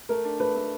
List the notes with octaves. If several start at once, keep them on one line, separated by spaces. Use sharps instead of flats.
A3 A#4
D4
A3 B4
A3